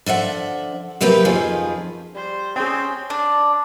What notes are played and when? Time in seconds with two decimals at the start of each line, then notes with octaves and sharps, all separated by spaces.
0.06 D3 F3 E5 F#5
1.01 C3 F#3 A#3 B3 G4 B4
1.25 F2 D#3 F3 F4 G#4 B4
2.15 G3 C5
2.56 C4 C#4 G#4 G5 C6
3.10 D4